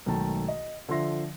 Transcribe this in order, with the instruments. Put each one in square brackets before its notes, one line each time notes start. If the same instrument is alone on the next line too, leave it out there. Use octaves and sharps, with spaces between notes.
[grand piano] B1 G#2 D#3 A3 A5
D#5
D3 F3 E5 C6 A#6